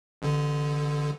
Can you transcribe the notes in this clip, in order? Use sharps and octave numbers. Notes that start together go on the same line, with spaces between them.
A1 D3